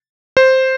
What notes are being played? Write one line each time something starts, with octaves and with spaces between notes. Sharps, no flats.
C5